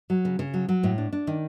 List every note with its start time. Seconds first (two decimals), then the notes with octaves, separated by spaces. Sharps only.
0.10 F#3
0.25 C#3
0.39 C#3
0.54 F#3
0.69 F#3
0.83 A2
0.98 D4
1.13 D4
1.27 D#3